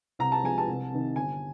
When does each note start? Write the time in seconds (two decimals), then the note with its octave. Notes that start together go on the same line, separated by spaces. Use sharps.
0.19 C2 A#5
0.32 A5
0.44 C3 F3 G#3 G#5
0.58 A5
0.68 C2
0.92 C3 D#3
1.16 G1 G#5